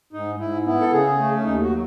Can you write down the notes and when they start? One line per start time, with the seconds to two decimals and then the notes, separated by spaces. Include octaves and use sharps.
0.13 G#2 D#4
0.40 G#2 E4
0.65 B3 E4
0.81 A4
0.92 C#3 G#4
1.18 A3
1.36 C#4
1.44 D#2 D#4
1.62 F#4
1.71 F#3